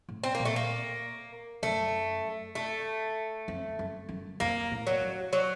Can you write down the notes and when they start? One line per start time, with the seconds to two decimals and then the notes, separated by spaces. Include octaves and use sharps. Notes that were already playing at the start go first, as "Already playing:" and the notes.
0.08 A2
0.24 C4
0.35 A#2 A#3
0.45 A3
0.56 A#3
1.63 F#2 A3
2.55 A3
3.48 F2
3.79 F#2
4.09 F#2
4.40 F2 A#3
4.71 A2
4.87 F#3
5.01 F#2
5.33 F#3